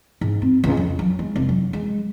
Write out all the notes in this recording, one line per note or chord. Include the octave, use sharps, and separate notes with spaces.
G#2
C4
C#2
F2
F#3
G#3
F1
F#3
G#3